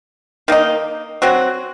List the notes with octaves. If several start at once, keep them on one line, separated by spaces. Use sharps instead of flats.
D#3 A#3 D#4
F#3 C4 F#4